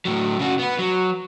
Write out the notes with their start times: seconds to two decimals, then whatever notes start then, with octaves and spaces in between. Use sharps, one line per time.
0.05 A2 F#3
0.39 C#3 F#4
0.59 B3 B4
0.79 F#3